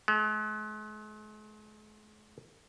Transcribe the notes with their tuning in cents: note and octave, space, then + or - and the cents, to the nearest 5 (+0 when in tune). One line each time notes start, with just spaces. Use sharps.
G#3 +45